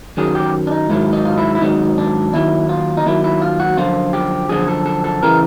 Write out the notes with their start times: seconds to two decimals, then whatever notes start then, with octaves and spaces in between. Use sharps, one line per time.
0.17 F#2 D#3 F#3 G#4
0.35 G4
0.67 D4
0.71 D#4
0.89 G#2 D#3 F#3 E4
1.13 D#4
1.25 F4
1.38 E4
1.55 E4
1.61 G#2 D#3 F#3 D#4
1.98 D4
2.33 D#2 D#3 F#3 E4
2.69 F4
2.97 D#4
3.06 D#2 D#3 F#3 E4
3.24 E4
3.42 F4
3.60 F#4
3.77 F#2 D3 F3 F4
4.13 G4
4.49 F#2 D3 F3 G#4
4.68 A4
4.86 A4
5.04 A4
5.23 C#3 E3 A#4